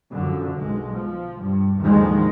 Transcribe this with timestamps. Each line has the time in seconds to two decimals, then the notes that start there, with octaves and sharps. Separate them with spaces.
0.13 F#2 D3 F3
0.58 B1 G#3
0.95 F3
1.42 G2
1.81 A1 D#2 D3 D#3 F3 G#3